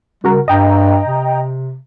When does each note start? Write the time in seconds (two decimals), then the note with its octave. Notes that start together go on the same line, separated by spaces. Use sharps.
0.24 C#3 G3 F#4 A#4
0.48 G2 D#5 G5 A#5
1.07 C3